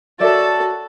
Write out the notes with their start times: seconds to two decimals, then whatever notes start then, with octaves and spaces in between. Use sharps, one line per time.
0.20 F#4 A4 C#5 D5 E5 A5